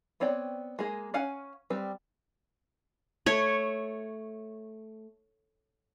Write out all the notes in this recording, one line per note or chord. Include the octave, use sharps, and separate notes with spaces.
B3 C4 C#5 D5 G5
G#3 A#3 G#4
C#4 F5 F#5 G#5
G3 C4 B4 G5
A3 C#5